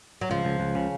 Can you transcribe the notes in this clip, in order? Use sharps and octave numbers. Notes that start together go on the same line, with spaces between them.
F#3
C#2 F3
C#2
C#2
C#3